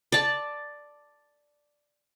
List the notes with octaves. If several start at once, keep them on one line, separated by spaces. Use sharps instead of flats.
D5 A5